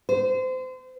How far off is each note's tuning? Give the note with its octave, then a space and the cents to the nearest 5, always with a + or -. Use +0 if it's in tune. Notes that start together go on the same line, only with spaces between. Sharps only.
C5 -30